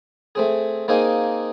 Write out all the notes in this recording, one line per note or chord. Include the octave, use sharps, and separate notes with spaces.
A3 C4 G#4
A#3 C4 D#4 G#4 F5 G#5